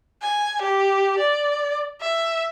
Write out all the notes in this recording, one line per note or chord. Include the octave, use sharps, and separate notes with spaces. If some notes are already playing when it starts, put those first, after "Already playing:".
G#5
G4
D5
E5